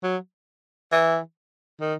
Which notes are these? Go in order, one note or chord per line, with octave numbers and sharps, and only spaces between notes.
F#3
E3
D#3